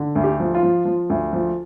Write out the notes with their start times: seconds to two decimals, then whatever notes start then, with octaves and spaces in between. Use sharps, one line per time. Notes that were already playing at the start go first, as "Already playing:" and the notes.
Already playing: D3
0.15 D2
0.24 G4
0.40 F3
0.55 F4
0.63 F3
0.85 F3
1.10 D2
1.33 F3